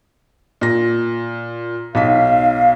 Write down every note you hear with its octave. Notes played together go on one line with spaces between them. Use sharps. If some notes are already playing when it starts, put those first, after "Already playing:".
A#2 A#6
B1 D#4 F5 B6